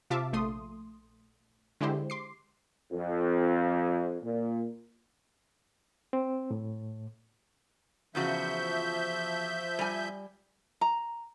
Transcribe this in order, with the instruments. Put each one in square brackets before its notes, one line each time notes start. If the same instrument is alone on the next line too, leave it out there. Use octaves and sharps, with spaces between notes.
[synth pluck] C3 F4 E5 F5 A5 D6
A#1 A3 C6 D#6
D3 G#3 E4 G4 C5
C6 D6 C7
[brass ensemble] F2
A#2
[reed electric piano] C4
A2
[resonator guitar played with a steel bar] E2 C#3 F#4 [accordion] F3 E5 G6
[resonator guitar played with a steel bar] G3 G#5
[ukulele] A#5